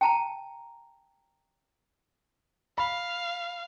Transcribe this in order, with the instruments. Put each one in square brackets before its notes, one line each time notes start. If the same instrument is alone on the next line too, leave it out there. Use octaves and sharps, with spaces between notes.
[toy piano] G5 A5 A#5
[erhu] F5 [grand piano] B5